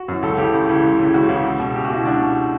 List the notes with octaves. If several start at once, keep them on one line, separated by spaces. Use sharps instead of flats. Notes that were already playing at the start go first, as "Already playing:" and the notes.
Already playing: F#4
F#2 E3
C#2 A4
C#3 E3 G4
C#2
C#3 E3
C#2
C#3 E3
C#2 F#4
C#3 E3
C#2
B2
C#2 G4
F#4
B2 E4
C#2 D4
B2